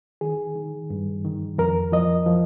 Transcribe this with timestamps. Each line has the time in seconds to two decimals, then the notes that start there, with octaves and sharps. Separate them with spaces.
0.21 D#3 G#4
0.56 D#3
0.90 G2
1.25 D#3
1.58 F2 A#4
1.92 F3 D#5
2.26 F3